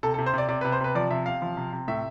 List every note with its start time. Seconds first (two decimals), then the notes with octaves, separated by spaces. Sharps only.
0.03 C3 A4
0.14 A4
0.18 C3
0.26 C5
0.34 C3 D5
0.48 C3 D5
0.61 C3 B4
0.72 C5
0.81 C3 B4
0.95 F3 D5
1.10 C3 E5
1.26 C3 F5
1.42 F3
1.57 C3
1.73 C3
1.88 A2 E5